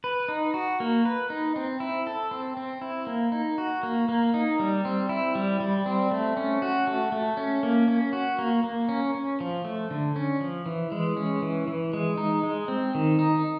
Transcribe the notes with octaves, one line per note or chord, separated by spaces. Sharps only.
B4
D#4
F#4
A#3
B4
D#4
C4
E4
A4
C4
C4
E4
A#3
D#4
F#4
A#3
A#3
D#4
G3
C4
E4
G3
G3
C4
A3
C#4
F#4
A3
A3
C#4
A#3
C#4
F#4
A#3
A#3
C#4
C#4
F3
A3
D3
C#4
F3
E3
G#3
C#4
E3
E3
G#3
D#4
G#3
C4
D#3
D#4